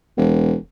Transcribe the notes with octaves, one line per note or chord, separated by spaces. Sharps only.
E1